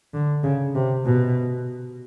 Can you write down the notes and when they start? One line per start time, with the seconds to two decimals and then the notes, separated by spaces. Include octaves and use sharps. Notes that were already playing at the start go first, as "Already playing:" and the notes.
0.14 D3
0.44 C#3
0.75 C3
1.06 B2